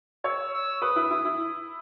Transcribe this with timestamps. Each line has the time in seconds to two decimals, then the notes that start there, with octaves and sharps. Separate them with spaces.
0.24 C#5 E6
0.53 E6
0.82 B4 D#6
0.96 E4
1.10 E4
1.25 E4